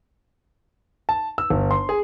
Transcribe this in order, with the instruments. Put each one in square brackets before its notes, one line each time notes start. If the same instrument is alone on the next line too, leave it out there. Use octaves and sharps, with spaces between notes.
[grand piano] A5
E6
G1
C6
G#4